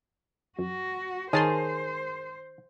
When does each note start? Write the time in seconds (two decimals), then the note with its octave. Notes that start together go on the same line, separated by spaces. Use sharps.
0.58 F#2 F#4
1.33 D#3 G#4 A#4 C5 C#5 G#5 A5 C6